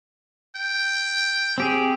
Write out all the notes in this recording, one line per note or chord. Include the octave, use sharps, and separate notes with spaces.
G5
C4 G4 G#4